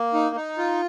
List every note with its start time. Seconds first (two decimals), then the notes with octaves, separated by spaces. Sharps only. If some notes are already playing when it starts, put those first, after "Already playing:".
Already playing: A#3
0.14 D#4
0.36 D#4
0.58 F4